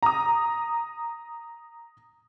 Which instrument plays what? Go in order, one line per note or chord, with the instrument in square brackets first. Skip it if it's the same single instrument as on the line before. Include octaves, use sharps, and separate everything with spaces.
[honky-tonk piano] A#5 D#6